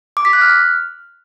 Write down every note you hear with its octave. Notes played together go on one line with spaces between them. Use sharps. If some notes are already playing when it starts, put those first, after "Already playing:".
D6
B6
F#6
F6